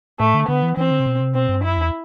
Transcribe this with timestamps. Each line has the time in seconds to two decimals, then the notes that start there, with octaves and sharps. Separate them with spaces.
0.19 A2 A3
0.34 D3
0.48 D3 B3
0.63 E3
0.77 E3 C4
0.91 D3
1.00 C3
1.06 B2
1.20 C3
1.34 B2 C4
1.49 G2
1.63 F#2 E4
1.78 E2